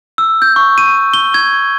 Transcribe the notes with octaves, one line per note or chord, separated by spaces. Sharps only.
E6
G6
C#6
D#7
G7
G#6